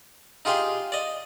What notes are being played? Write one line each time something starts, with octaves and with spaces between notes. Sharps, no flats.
D#4 F4 G4 G#4 F5 G5
D5 D#5